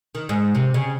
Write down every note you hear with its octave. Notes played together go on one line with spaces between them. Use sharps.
D#3
G#2
C3
C#3